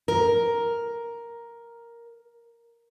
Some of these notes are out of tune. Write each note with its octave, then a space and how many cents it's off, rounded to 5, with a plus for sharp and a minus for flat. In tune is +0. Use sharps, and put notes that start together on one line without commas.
A#4 +5